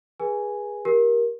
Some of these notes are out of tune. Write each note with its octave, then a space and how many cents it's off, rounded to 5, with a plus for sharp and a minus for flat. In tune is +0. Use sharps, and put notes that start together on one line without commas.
G#4 -10 B4 -25 G#5 +0
G4 +0 A#4 +15